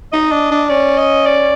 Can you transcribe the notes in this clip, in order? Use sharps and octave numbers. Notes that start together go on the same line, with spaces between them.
D#4 D#5
D4
D4
C#4 D5
D#5
D5